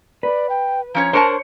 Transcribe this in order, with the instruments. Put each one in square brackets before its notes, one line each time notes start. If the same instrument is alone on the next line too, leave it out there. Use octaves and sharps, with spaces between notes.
[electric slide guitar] B4 [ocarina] D5
[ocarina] G5
[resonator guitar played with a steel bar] F3 C#4 C#5 [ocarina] A#5
[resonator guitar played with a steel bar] D4 A#4 A5 [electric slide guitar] C5 C#5